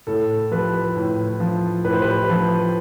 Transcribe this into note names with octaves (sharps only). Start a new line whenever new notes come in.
A2 A4
F3 G4 B4
A2
F3
A2 B4
C5
G4 B4
F3